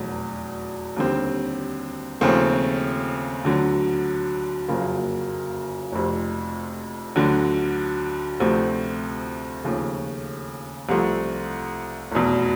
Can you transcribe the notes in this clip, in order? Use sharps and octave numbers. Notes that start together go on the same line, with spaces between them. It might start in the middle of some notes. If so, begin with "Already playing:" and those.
Already playing: F1 E2 B2 F#3
D#2 D3 G3 C4
D#2 C#3 F3 A3 C4
D2 D3 F#3
F#1 F2 C#3 F#3 A#3
F1 F2 C3
D2 D3 F#3
D2 C3 F3 A3 C4
D#2 C#3 F3 A3
C2 C3 F3 A3
F1 E2 B2